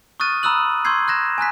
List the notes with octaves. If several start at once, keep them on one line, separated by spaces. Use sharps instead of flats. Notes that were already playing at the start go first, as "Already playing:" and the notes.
C#6 D#6 F6 F#6 A6 D#7
A#5 B5 D#6 E6 F#6 F#7
C6 C#6 E6 G6 G#6 C7
F#6 G#6 A#6 E7
G#5 A#5 F#6 B6